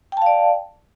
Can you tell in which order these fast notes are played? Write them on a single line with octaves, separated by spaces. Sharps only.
G5 A5 F5 D5